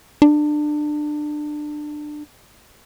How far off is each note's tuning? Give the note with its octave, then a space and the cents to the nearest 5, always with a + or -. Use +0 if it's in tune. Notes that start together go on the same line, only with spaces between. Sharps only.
D4 +25